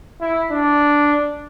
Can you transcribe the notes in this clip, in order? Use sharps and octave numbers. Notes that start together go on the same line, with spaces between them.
E4
D4